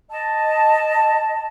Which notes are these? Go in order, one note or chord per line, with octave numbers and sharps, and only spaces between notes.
D#5 A5